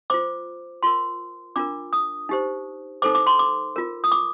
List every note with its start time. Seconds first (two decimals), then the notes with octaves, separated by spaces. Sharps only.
0.10 F4 C5 D6
0.83 F4 A#4 C6
1.56 D4 F4 A#4 D6
1.93 D#6
2.29 D#4 G4 C5
3.02 D#4 A4 C5 D6
3.15 D6
3.27 C6
3.39 D6
3.76 F4 A#4
4.04 D#6
4.12 D6